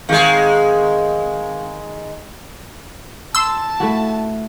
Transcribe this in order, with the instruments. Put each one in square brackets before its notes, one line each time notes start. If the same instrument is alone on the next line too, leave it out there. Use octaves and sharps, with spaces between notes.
[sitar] D#3 G#3 [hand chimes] C4 G#4 F5
[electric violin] A5 [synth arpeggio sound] C6 E6
[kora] A3 E4 F#4